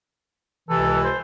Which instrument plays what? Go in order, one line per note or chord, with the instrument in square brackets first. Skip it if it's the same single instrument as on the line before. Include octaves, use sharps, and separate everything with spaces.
[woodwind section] C#2 C3 E3 [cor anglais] A4
[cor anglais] C5